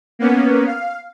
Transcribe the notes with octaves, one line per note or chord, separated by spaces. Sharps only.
A#3 B3 C#4
F5